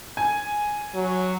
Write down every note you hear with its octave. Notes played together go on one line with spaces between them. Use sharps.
G#5
F#3